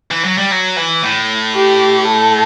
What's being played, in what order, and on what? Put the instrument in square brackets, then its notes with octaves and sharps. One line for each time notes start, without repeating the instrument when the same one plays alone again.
[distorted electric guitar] E3
F#3
G3
F#3
E3
A2
[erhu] G4
A4